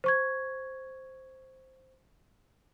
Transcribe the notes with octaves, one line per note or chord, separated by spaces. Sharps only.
C5 C#6 G#6